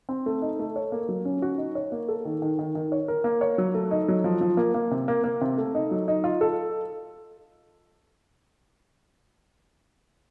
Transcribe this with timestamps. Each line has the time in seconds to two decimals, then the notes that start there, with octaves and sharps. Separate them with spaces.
0.09 C4
0.26 A3
0.42 D#4
0.59 A3
0.76 C#5
0.92 A#3
1.09 F#3
1.25 C#4
1.42 F#4
1.58 D#4
1.75 C#5
1.92 A#3
2.08 A4
2.25 D#3
2.42 D#3
2.59 D#3
2.75 D#3
2.92 C#5
3.08 A#4
3.24 A#3
3.41 C#5
3.58 F#3
3.74 A3
3.91 D#4
4.08 F#3
4.24 F3
4.41 F3
4.57 A#3
4.74 A#3
4.91 C3
5.08 A#3
5.24 A#3
5.41 C3
5.57 A3
5.75 D#4
5.91 F#3
6.08 D#4
6.24 F4
6.41 A4